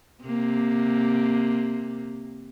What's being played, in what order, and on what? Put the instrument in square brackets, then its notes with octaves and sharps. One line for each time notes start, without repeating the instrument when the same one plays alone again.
[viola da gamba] C3 A#3